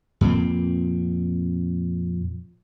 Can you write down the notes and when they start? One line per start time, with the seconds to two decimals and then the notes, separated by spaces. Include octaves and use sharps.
0.21 F2 A#2 C4